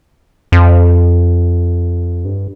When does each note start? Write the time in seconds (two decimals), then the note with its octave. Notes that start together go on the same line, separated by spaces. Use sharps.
0.52 F2
2.25 G2